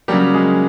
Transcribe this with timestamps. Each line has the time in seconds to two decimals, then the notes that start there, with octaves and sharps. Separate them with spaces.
0.08 C#3 F#3 G3 A#3 G4
0.34 G#3 G#4